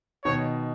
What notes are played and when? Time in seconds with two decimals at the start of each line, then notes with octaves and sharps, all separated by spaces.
0.25 B2 D#3 C#5